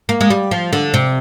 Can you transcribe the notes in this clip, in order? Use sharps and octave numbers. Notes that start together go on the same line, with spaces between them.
A#3
G#3
G3
F3
D3
C3